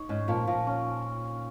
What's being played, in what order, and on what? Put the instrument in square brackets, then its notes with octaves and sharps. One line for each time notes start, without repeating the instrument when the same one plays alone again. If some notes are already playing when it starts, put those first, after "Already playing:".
Already playing: [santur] D#4 C#5
[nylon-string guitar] G#2 [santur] C#4
[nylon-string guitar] A#2 [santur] F3
[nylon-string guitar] A#2 [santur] F3
[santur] C#4